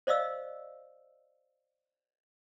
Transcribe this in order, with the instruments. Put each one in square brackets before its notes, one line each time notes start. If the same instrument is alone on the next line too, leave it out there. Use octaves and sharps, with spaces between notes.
[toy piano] C5 D5 D#5 F5 E6